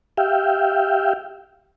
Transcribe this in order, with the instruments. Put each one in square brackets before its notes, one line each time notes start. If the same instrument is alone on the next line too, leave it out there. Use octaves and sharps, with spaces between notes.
[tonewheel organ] G4 E5 F5 G5